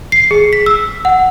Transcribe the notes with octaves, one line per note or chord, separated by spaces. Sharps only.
C7
G#4
B6
E6
F#5